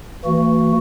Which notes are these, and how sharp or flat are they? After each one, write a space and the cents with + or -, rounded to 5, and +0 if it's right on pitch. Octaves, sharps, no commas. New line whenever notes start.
E3 +0 A3 +45 F#4 +0